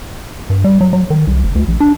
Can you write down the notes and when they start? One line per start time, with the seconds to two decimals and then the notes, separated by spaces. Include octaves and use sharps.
0.50 G2
0.64 G3
0.81 F#3
0.93 F#3
1.10 D#3
1.27 C2
1.44 F#1
1.55 D2
1.68 A#1
1.80 D4